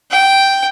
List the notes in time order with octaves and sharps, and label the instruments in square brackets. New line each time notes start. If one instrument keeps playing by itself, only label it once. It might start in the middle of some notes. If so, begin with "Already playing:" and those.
[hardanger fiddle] G5